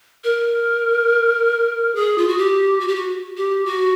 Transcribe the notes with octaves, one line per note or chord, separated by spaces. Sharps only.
A#4
G#4
F4
F#4
G4
F#4
G4
F#4
G4
F#4